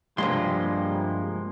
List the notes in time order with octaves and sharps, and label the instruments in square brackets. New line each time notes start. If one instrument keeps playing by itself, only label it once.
[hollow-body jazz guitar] G2 C3 C6 [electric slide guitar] F3 G#3 A#3 [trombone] G3